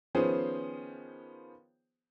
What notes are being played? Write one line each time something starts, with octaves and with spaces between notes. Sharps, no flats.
D#3 F3 B3 C#4 G#4 C5